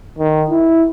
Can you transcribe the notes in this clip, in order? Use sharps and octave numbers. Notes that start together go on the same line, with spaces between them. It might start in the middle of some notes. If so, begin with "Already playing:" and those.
D#3
E4